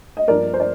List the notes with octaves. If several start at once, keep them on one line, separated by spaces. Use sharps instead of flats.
D#5
G2 F3 A#3 D4 A#4 D5
C5
D5